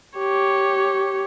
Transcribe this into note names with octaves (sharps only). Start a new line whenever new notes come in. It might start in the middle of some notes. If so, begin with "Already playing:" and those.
G4 C#5